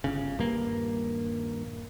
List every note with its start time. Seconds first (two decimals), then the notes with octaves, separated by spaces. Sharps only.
0.04 G1 C#3
0.37 D#1 G2 A#3